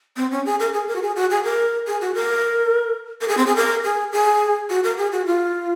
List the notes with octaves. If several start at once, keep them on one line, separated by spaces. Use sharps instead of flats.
C4
C#4
G#4
A#4
G#4
A#4
F#4
G#4
F#4
G#4
A#4
G#4
F#4
A#4
A#4
G#4
C4
G#4
A#4
G#4
G#4
F#4
A#4
G#4
F#4
F4